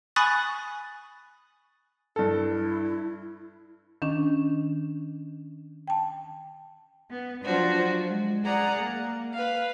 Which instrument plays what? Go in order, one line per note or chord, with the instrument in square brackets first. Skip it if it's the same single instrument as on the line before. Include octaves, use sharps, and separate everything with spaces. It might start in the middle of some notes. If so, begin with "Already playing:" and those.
[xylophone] G#5 B5 C#6 D#6 F#6 A6
[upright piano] G2 A4 [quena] E4
[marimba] D#3 C#4 D4
G5 A5
[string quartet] B3
F3 F#3 D4 F4 F#4 C5
G#3
G#4 D5 F#5 A#5
A#3
B4 F5